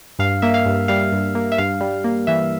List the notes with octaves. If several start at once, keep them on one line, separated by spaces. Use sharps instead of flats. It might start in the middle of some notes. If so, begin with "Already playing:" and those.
G2 F5
A#3 E5
F5
G2
G3 F5
G2
A#3
E5
G2 F5
G3
A#3
E3 E5